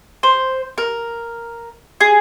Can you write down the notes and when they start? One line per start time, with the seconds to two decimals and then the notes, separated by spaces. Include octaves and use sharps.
0.23 C5
0.78 A#4
2.01 G#4